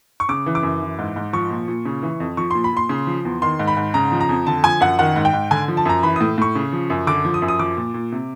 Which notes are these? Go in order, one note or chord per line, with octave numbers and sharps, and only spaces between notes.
C#6
C#3 D6
E3
D6
F#2
E3
G#2
G#2
F3 C#6
A#2
A#2
C#3
E3
F2
F3 C#6
A#2 C6
B5
A#2 C6
C#3
F3
E2
D#3 C6
G#2
B5
G#2
C#3 A#5
F3
A#5
F2
D3 A5
F3 G#5
F#2 F#5
D#3 F#5
G#2
G5
G#2
D3 G#5
F3
A5
F#2 A#5
E3 B5
A2 D#6
A2 C#6
C#3
F3
F#2
D3 D6
F3
D#6
F#2
D#6
F3 D6
A#2
A#2
C3